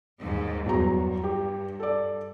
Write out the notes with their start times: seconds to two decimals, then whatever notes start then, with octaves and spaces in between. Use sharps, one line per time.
0.20 D#2 G#2 D#3
0.66 E2 G2 F#3 A#5
1.24 G4
1.80 A4 D5